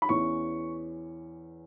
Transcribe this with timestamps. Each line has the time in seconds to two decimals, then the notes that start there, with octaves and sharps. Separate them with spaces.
0.02 B5
0.09 E2 E3 C#4 C#6